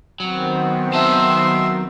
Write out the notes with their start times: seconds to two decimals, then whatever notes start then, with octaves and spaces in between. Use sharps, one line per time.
0.20 D#3 F#3 B3 C4
0.93 F#3 E5 A5 C6